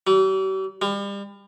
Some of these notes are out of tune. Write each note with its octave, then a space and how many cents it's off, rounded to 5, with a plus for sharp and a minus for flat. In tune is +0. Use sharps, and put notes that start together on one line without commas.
G3 -45
G3 +35